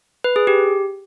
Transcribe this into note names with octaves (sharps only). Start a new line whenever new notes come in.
B4
G#4
G4